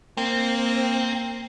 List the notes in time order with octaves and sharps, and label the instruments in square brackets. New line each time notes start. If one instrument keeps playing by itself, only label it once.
[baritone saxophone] A#3 [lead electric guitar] C4